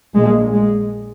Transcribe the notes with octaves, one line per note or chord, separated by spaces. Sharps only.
A#1 A#2 G#3
G#3